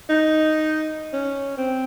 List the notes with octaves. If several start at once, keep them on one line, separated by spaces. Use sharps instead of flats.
D#4
C#4
C4